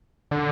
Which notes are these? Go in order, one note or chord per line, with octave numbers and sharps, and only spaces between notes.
D3